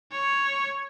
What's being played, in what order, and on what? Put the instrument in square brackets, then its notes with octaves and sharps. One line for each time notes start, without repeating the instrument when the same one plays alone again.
[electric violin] C#5